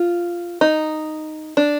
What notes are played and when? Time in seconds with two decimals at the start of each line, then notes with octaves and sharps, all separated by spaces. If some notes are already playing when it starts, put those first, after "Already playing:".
Already playing: F4
0.61 D#4
1.57 D4